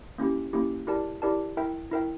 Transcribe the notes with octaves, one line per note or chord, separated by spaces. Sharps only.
A#3 C#4 E4 G4
A#3 C#4 E4 G4
E4 G4 A#4 D5 A5
E4 G4 A#4 D5 A5
E4 A#4 E5 G5
E4 A#4 E5 G5